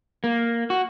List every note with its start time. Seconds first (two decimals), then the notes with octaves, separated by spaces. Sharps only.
0.24 A#3
0.70 F#4